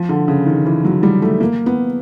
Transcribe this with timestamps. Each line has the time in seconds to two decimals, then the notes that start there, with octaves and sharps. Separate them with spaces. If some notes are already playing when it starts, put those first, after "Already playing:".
Already playing: F3
0.09 D3
0.28 C#3
0.46 D#3
0.66 E3
0.85 F#3
1.03 G3
1.22 A3
1.40 A#3
1.66 B3